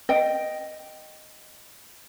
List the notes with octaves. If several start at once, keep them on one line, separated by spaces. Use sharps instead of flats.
D#5 G5